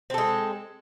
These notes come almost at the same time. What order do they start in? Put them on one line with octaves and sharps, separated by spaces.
C4 A4 G#3